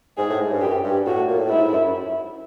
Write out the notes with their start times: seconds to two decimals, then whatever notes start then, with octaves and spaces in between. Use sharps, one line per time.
0.18 G#2 G#4
0.29 A2
0.40 G#2
0.51 G2
0.61 F#2 G4
0.83 G2
1.06 A2 F#4
1.27 A#2
1.39 A2
1.49 G#2 E4
1.72 F#2
1.86 F#2